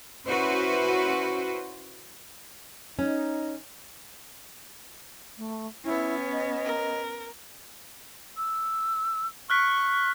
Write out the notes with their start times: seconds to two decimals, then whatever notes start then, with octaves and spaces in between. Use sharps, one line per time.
0.25 C#4 E4 F#4 B4 C5
2.99 C#4 D#4
5.38 A3
5.84 B3 C#4 E4
6.32 D#5
6.65 A#4
8.37 E6
9.50 C#6 F6 F#6 B6